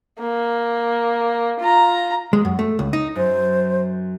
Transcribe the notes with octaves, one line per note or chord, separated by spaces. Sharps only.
A#3
F4 A#5
G#3
F#2
A3
C#2
D#4
F#2 C5